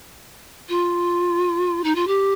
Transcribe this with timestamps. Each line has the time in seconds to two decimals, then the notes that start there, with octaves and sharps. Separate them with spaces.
0.69 F4
1.84 D#4
1.95 F4
2.07 G4